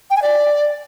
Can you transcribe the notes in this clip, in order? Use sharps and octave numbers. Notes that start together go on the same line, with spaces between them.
G5
G#5
D5